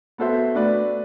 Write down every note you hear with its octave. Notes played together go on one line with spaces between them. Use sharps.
B3 F#4 A4 C5 E5
A3 D4 F#4 B4 D5